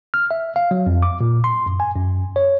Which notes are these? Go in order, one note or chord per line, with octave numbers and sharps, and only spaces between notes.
F6
E5
F5
F#3
F2
D6
A#2
C6
F#2
G#5
F#2
C#5